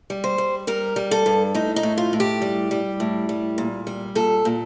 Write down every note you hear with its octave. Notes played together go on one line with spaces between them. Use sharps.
G3
C5
G3
G3 A#4
G3
A4
G2
A2 D#4
D#4
A2
F4
A2
G4
G3
G3
A2
G3
A#2
G3
A#2 A4
A#2